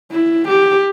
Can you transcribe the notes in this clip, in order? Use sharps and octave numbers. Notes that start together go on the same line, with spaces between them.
E4
G4